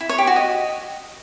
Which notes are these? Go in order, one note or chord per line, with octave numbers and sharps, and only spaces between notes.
E4
C#5
G4
F#4
D#5